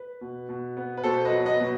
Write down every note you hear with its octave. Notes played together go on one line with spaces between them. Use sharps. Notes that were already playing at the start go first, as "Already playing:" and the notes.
Already playing: B4
B2
B2
B3
B4
B2 A4 C5
B4 D#5
F#3
B4 D#5
B2